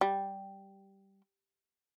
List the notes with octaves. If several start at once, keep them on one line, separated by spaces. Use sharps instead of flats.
G3